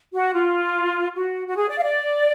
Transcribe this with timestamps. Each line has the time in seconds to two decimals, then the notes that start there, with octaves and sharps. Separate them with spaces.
0.12 F#4
0.33 F4
1.15 F#4
1.46 F#4
1.56 G#4
1.69 D5
1.78 F5
1.82 D5